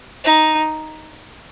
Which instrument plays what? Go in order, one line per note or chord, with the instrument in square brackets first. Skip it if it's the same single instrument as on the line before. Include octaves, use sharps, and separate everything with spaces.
[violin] D#4